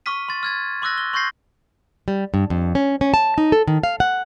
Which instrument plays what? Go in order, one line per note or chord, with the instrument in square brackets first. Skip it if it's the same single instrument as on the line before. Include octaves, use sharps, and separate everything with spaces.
[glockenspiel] C#6 D6 F6 B6 D#7
C6 A6
F6 G#6 A6
C6 D6 E6 F#6 A#6
G7
C6 C#6 G6 A#6 C7
[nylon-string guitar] G3
G2
F2
C#4
C#4
A5
D#4
A4
D#3
F5
F#5